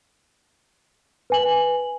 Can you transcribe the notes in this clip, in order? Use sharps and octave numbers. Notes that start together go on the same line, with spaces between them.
B4 G#5 F#7